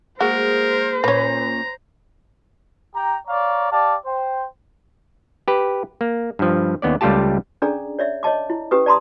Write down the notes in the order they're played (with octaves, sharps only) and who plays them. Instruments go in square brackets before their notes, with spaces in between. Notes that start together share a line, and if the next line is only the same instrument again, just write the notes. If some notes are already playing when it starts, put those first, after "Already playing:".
[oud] G#3 A#3 [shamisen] F#4 [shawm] A#4 [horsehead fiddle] C5
[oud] A#2 C#4 [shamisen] B4 C#5 [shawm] A#5
[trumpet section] G4 G5 A#5
C#5 D5 F5 A#5
G4 D5 F5 A5
C5 G5
[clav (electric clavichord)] G4 B4
A#3
G2 F3
D#2 B3 C#4 D5
C#2 G3 A3 F4 G4 A5
[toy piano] C#4 D4 G#4 A4 D5 A#5
C#5 D5 E5
C#5 D#5 A5 D6
E4
C#4 G4 B4 D#6
D5 A5 A#5 C6 D#6